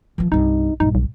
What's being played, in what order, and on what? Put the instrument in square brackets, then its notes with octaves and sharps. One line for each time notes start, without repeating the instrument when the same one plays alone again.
[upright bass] E3 F3
[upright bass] C2 G2 [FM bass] D#4
[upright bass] A#1 G2 [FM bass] D#4
[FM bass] B1